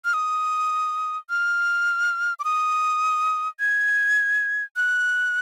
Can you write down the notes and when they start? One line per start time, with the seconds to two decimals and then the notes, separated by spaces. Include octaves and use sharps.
0.05 F6
0.14 D#6
1.30 F6
2.39 D6
2.44 D#6
3.60 G#6
4.76 F#6